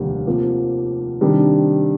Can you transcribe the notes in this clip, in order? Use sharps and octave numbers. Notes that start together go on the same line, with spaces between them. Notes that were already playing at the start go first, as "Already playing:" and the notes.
Already playing: F1 D#2 D3 G3 A#3
C3 F3 A#3
C3 D#3 G3 D4